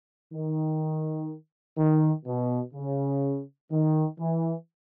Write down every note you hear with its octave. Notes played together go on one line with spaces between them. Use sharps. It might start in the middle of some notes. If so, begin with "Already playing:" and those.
D#3
D#3
B2
C#3
D#3
E3